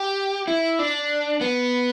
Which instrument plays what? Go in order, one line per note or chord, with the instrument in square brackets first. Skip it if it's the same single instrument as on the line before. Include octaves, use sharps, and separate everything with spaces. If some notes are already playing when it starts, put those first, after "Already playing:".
Already playing: [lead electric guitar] G4
E4
D4
B3